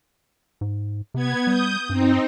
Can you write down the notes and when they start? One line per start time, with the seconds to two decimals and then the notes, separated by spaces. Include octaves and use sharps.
0.61 G#2
1.14 C3 B3 G#6
1.47 G3 D#6 G6
1.89 G2 C4 D#4